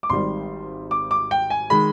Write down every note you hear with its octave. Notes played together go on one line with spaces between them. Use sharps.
D6
G#1 G#2 D#3 G3 C6
D6
D6
G5
G#5
D#3 G#3 B5